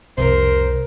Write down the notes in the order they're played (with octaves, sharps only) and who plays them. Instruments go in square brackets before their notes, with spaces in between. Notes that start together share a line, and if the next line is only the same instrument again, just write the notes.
[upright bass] C2 [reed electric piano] F2 C3 [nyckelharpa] A#4 [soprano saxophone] C5